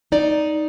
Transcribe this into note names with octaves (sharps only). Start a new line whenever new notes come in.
D#4 D5